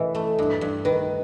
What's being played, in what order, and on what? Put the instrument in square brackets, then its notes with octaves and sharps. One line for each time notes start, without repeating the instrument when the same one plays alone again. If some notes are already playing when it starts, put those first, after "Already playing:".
Already playing: [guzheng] A2 E3 [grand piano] B4 D#5 E5
[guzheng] A3
G2
G2
[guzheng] D#3 [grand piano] B4